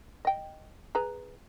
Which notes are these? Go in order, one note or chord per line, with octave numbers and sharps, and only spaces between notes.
D#5 G5
G#4 B4 A#5